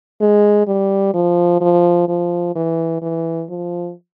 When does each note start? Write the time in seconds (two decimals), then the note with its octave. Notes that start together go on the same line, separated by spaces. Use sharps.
0.21 G#3
0.67 G3
1.14 F3
1.61 F3
2.08 F3
2.55 E3
3.02 E3
3.49 F3